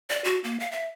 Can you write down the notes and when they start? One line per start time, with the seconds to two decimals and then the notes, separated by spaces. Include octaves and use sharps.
0.10 D5
0.24 F#4
0.44 A#3
0.60 F5
0.72 E5